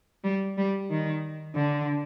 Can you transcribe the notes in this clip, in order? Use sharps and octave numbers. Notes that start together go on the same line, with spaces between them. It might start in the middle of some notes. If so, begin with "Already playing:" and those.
G3
G3
D#3
D3